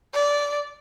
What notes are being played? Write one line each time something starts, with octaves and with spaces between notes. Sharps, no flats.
D5